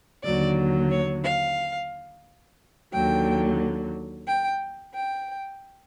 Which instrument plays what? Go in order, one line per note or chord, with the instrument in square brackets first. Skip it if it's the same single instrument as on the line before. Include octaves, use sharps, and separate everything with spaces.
[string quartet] D#2 D3 F#3 D5
C#5
F5
D#2 D3 F#3 G5
G5
G5